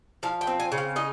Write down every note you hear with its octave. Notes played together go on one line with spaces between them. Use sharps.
F3 F5
G5
C4
G#5
C#3
F5
D#4 D#5